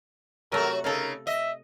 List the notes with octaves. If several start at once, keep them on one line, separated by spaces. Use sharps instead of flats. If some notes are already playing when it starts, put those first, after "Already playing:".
C3 F#3 A3 F#4 A#4
C#3 D#4 A4 A#4 F5
D#5 E5